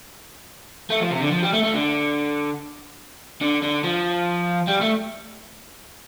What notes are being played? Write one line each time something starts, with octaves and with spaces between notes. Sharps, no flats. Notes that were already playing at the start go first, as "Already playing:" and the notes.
A3
F3
C3
D3
F3
G3
A3
A3
D3
D3
D3
F3
G3
A3